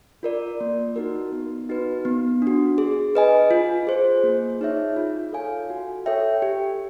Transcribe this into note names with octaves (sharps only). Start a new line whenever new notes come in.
F4 A#4 D5
A#3
D#4 F#4 A#4
B3
D#4 F#4 B4
B3
D4
F#4
G#4
B4 D#5 G#5
F4
G#4 C5
A#3
D#4 G#4 C#5 E5
F4
A4 C#5 F5 G#5
F#4
A4 C#5 E5 G5
G4